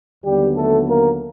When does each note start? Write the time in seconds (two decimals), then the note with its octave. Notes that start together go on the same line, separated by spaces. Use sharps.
0.24 D#2 D3 F#3 G3 B3 G4
0.56 A3 A4
0.88 A#3 A#4